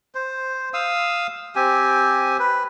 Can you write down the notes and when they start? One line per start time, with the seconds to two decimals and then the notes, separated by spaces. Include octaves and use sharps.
0.15 C5
0.74 F5 D#6 E6
1.56 C4 G4 G#5
2.39 B4